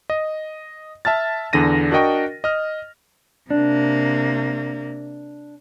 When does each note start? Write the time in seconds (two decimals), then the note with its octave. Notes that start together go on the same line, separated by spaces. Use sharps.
0.10 D#5
1.05 E5 A5 F6 A6
1.53 E2 D3 D4 A#6 D#7
1.91 D4 F#4 A#4 D#5 G5 C#6
2.44 D#5 F6
3.51 C3 A#3 D4